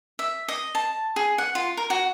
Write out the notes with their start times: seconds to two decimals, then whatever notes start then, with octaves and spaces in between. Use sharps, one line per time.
0.19 E5
0.48 D#5
0.75 A5
1.16 G#4
1.38 F#5
1.55 F4
1.77 A#4
1.90 F#4